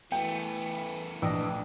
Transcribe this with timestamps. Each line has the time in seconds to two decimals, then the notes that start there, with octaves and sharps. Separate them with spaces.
0.12 E3 A3 B3 G5
1.22 A#1 E3 D4 D#5